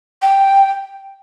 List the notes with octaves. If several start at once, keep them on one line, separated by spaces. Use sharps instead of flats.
G5